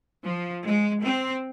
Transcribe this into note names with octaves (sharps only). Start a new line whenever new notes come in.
F3
G#3
C4